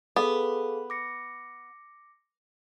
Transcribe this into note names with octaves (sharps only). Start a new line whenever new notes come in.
B3 G#4 A4 F5
D6 A#6 C#7